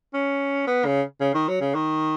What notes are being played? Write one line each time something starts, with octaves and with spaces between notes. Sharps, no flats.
C#4
B3
C#3
C#3
D#3
F#3
C#3
D#3